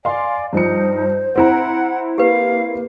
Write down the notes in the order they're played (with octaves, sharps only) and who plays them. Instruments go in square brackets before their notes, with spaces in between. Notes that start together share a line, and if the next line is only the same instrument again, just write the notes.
[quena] D5 [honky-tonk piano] F5 C6 [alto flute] G#5
[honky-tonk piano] G2 F3 C#7 [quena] D#4 [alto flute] C5
[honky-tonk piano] C4 E4 A#5 [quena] F#5
[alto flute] A#3 [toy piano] G4 B4 [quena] F5